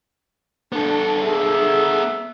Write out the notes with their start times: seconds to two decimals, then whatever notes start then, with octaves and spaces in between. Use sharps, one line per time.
0.72 B3 D4 A4
1.22 G#4 E5